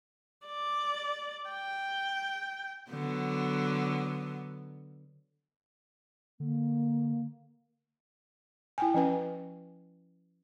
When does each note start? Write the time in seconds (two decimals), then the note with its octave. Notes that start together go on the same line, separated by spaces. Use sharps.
0.47 D5
1.50 G5
2.90 D3 F#3 B3
6.40 D3 A#3
8.78 E4 G5 G#5
8.94 F3 C#4 B4 G#5